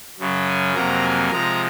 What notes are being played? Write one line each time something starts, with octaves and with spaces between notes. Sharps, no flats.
F#2 C#3 F#3
G#5
F2 C3 F#3 A#3 A#5
G#5
C3 F3 G#3 A#5